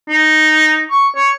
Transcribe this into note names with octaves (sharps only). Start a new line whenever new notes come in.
D#4
C#6
C#5